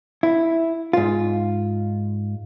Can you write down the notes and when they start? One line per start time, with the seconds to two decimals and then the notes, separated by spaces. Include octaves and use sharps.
0.23 E4
0.93 G#2 F4